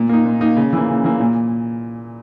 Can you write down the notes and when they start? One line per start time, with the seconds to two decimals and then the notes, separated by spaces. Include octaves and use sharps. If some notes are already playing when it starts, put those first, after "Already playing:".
Already playing: A#2
0.09 A#3 D#4
0.25 A#2
0.41 A#3 D#4
0.56 C#3
0.73 E3 A#3
0.88 C#3
1.04 E3 A#3
1.20 A#2